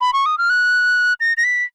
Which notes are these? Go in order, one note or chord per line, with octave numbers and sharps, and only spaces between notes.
B5
C#6
D#6
F6
F#6
A#6
A#6
B6